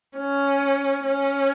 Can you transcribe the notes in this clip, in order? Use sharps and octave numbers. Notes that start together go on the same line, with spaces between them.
C#4
C#4